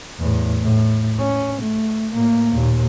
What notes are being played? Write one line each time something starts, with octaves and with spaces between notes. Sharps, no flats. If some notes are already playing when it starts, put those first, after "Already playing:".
E2 A2
A2
C#4
A3
A2 A#3
D#2 A#2